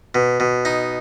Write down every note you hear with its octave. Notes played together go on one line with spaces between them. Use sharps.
B2
B2
D#4